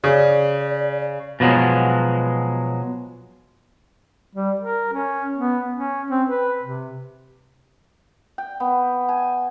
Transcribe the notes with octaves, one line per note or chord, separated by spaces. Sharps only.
C#3 D5
B2 F3 F#3 G#3
G3
A#4
C#4
B3
C#4
C4
B4
C3
G5
B3
G#5